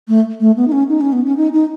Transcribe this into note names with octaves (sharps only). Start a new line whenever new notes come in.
A3
A3
B3
D#4
C#4
D#4
C#4
B3
C#4
D#4
D#4